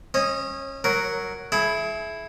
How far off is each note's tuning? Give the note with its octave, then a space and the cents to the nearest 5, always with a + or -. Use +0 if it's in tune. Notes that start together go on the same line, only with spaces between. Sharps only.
C#4 -30 D#5 +0
F#3 +0 A#4 +0
E4 +0 G#4 +40